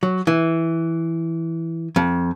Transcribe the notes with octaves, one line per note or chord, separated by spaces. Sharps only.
F#3
E3
F2